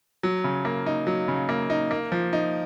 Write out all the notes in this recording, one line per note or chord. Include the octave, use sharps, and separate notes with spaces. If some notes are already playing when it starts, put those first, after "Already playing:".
F#3
C#3
A#3
D#4
F#3
C#3
A#3
D#4
A#3
F3
D#4